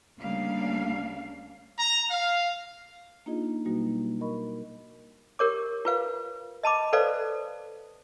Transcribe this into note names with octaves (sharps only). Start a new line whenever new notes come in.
D2 C#3 G3 A#3 D4 F5
A#5
F5
A#3 D4 D#4 F4 G#4 D#5
B2 F#3 G3 A#3 D#4 F#4
A#4 D#5 B5 C#6
G4 A#4 C#5 D6
F4 B4 F5
D#5 A5 B5 D6
A4 B4 C5 D5 F5